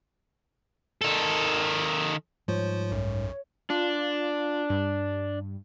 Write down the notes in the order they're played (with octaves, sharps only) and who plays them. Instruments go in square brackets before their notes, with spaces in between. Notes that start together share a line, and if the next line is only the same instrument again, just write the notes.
[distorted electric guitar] D#3 A4
[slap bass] G#2 G3 [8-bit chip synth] F3 F4 C5 [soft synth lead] C#5
[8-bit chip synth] B1 F#2
[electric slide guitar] D4 [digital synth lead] F4
[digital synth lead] G2